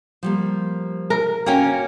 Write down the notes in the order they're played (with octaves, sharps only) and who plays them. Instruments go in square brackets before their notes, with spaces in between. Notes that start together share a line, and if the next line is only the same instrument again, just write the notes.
[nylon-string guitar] F3 G3 A#3
[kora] A#4
[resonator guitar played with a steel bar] A#3 C#4 [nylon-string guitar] F#4 G5